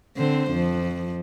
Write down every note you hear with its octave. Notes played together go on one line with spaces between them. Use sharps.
D3 C4 C5
F2 F3